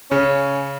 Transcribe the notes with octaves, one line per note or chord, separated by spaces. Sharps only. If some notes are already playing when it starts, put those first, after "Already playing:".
C#3 C#4